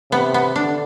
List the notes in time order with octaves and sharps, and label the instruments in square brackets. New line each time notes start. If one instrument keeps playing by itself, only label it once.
[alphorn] C3 [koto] B3
[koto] B3
[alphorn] D3 [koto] D4